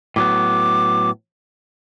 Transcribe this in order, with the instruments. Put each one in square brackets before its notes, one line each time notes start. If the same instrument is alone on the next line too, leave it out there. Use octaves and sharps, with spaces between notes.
[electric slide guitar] A2 F#3 B3 [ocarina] D6